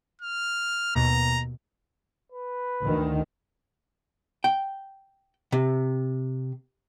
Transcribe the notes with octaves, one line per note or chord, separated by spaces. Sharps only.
F6
D#2 B2 A#5
B4
D2 D#3
G5
C3